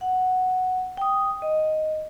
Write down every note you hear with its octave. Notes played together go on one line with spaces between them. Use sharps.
F#5
G5 D#6
D#5